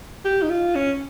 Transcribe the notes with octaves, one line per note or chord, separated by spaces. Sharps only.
G4
D#4
F4
C#4